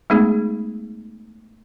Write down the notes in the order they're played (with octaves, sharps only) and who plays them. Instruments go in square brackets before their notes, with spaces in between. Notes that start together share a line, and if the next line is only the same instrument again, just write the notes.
[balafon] G#3 A3 B3 D#4 G#4